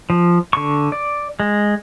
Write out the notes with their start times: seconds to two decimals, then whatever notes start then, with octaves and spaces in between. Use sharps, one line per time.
0.10 F3
0.53 D3 C#6
0.92 D5
1.40 G#3